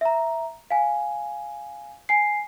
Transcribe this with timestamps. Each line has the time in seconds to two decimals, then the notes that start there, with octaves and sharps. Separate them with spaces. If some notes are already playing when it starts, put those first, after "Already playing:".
0.01 E5 A#5
0.71 F5 G#5
2.09 G#5 C7